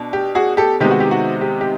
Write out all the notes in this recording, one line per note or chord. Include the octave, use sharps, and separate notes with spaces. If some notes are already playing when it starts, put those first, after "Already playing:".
Already playing: B2 D4
G4
F#4 G#4
G4 A4
C3 D#3 G#3 B3 D#4 G4
F#4
G4
F#4
G4
G4